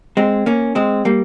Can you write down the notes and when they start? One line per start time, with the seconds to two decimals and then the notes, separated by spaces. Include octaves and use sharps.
0.17 G#3 C4
0.46 A#3 C#4
0.75 G#3 C4
1.05 G3 A#3